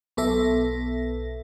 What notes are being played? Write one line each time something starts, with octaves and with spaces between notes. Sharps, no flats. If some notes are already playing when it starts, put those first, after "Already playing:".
B1 B3 A4 E5 A#6